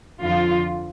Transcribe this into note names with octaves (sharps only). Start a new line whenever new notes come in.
F2 D3 F3 F4